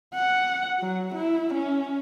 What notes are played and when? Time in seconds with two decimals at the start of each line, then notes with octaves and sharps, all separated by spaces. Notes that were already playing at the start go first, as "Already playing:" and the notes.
0.14 F#5
0.79 F#3
1.14 E4
1.53 C#4